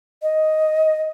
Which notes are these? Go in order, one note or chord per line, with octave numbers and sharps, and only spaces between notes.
D#5